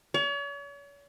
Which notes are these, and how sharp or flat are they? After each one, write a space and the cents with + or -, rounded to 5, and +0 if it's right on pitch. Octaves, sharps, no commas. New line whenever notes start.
C#5 +40